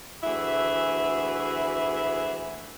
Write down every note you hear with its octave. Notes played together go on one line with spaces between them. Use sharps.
D2 E3 E4 F#4 G#4 E5